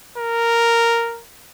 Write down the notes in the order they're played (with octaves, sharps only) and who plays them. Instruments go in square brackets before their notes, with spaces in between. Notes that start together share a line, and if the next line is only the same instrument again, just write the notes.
[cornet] A#4